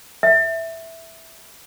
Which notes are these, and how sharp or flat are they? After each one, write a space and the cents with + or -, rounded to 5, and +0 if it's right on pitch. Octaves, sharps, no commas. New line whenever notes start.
E5 +0